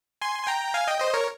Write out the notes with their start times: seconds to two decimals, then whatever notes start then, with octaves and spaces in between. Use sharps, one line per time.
0.21 G#5 C6
0.43 G#5
0.47 G5 A#5
0.74 F5 G#5
0.87 D#5 G5
1.00 C5 D#5
1.14 A#4 C#5